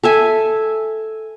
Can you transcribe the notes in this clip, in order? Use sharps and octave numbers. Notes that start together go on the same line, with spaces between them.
A4 E5 G#5